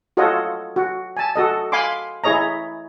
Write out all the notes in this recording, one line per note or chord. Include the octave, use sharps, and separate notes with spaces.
F4 F#4 A4 C#5 D#5
F#4
G#5 A5
F#4 A4 D#5
F5 G#5 B5 C6 D6
E4 G#4 C#5 D#5 A#5